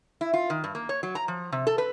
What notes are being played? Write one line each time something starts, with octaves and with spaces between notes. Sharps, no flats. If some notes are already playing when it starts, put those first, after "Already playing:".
E4
F4
D#3
G2
A#3
C#5
F#3
A#5
F3
C3
A4
B4